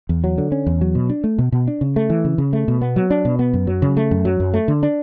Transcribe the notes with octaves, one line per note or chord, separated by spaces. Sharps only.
E2
F#3
D3
C#4
E2
F#3
B2
D4
A3
B2
B2
D4
C#3
A3
E3
C#3
C#3
A3
B2
B3
F#3
D4
B2
B3
F#2
F#3
C#3
A3
F#2
F#3
F#2
A3
D3
D4